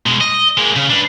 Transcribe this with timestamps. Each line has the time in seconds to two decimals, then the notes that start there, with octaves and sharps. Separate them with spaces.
0.06 B2 G#3
0.21 D#5
0.58 G#3 A#3
0.76 C#3
0.90 D4 B4